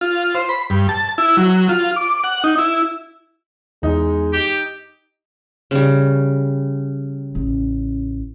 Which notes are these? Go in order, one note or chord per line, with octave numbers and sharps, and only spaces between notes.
F4
C5
B5
G2
A5
E4
F#3
F4
D6
F#5
D#4
E4
E2 G#3 D#4
G4
C#3 G3
A1